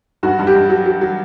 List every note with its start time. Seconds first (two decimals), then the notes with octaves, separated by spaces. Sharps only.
0.23 G2 F#4
0.39 G2
0.47 G4
0.55 G2
0.70 F#3
0.86 F#3
1.01 F#3